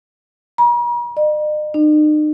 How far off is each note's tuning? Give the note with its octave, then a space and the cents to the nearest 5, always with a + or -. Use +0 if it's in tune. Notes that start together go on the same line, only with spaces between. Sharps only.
A#5 +45
D#5 -45
D#4 -40